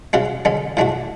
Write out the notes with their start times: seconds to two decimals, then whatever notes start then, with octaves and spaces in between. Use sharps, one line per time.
0.13 C#3 G#3 C#4 F#4
0.45 D3 G#3 C#4
0.77 A2 G#3 D4 F#4